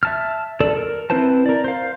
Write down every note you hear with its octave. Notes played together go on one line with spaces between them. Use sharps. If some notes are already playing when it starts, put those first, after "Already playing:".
E5 A5 F6
A4 D5
A#4
C4 E4 B4 C5 A5
A#4 D5
C5 F5